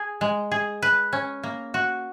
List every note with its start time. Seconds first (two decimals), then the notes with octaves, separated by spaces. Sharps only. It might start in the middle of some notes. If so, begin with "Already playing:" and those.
Already playing: G#4
0.21 G#3
0.52 G#4
0.82 B4
1.13 C#4
1.44 A#3
1.74 F#4